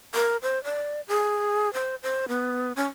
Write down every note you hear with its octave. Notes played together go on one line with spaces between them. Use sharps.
A#4
C5
D5
G#4
C5
C5
B3
C#4